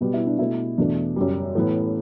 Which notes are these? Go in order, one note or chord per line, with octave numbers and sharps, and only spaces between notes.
B2 G3 B3
E4
D4
B2 A3 E4
E2 B2 A3 D4
F#2 C#3 G3
A2 E3 B3